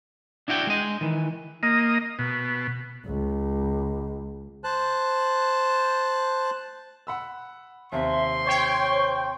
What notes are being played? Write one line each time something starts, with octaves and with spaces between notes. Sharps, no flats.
D4 E4 F#4 E5 G5
G#3 D#5
D#3 E3
A#3 D#5
B2
C#2
C5 A5 F#6
F#5 B5 E6
D#2 C3 E5 C6
C5 C#5 G5 C#6